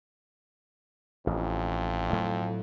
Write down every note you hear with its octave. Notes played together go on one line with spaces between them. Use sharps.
A1 F2
A2 F#3 A3